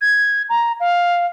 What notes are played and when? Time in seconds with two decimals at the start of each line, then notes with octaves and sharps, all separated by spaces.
0.01 G#6
0.49 A#5
0.80 F5